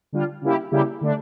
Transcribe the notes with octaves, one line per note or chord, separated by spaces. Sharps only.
D3 G3 D4 F4
C#3 G3 A#3 E4 G4
C#3 G3 A#3 E4 G4
D3 A3 D4